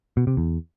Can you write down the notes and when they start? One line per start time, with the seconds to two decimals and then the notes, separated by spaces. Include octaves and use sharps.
0.17 B2
0.27 C3
0.37 E2